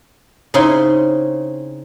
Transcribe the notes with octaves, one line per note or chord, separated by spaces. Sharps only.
C#3 C4 D#4 E4 C6